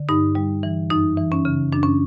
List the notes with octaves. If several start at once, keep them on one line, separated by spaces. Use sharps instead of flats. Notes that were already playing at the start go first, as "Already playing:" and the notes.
Already playing: D3
G2 D#4
G3
E3
F#2 D#4
E3
C#4
C#3
F#2 D4
C#4